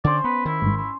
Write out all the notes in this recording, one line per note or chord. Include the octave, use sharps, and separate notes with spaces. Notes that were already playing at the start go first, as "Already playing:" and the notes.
D3 C#4 C5 D5
B3 B4
D#3 E4
G#1 G#2
E4